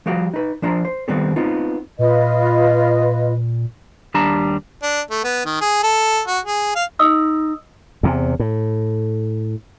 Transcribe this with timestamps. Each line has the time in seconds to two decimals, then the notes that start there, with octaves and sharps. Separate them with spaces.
0.06 F3 G3 F#4 G4 F5
0.34 D#4 B4
0.62 F3 D4 C5 A#5
0.85 C5
1.08 D#3 G3 B3 C4 G4 A4
1.36 B3 C4 D#4 F4
1.99 A#2 F4 B4 D#5
4.14 D#2 G3 D4 A5 A#5
4.82 D4
5.11 A3
5.24 B3
5.45 D#3
5.61 G#4
5.83 A4
6.28 F#4
6.45 G#4
6.75 F5
6.99 D#4 D#5 D#6 E6
8.03 E2 C3
8.40 A2